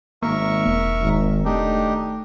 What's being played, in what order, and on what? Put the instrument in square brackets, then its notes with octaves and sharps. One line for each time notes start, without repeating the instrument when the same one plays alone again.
[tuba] G#1 [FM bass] A#3 [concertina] A#4 E5 C#6
[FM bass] E1
[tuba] G#1
[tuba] A3 [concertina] D4 D#4 G4